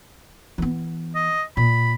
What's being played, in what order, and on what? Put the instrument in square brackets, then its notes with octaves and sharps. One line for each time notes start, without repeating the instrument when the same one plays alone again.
[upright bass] E3 B3
[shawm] D#5
[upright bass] A#2 [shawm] B5